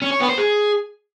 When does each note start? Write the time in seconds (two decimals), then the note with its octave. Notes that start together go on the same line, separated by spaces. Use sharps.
0.02 C#4
0.11 C#5
0.20 B3
0.29 C5
0.38 G#4